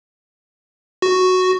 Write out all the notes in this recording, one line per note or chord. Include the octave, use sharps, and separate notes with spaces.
F#4